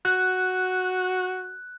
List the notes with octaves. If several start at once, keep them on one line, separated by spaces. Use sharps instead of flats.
F#4 F#6